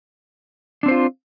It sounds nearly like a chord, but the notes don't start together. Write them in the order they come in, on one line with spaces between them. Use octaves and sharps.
D4 C4 C5 F4